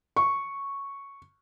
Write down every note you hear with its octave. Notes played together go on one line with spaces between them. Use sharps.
C#6